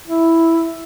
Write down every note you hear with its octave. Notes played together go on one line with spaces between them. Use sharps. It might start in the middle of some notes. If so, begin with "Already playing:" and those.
E4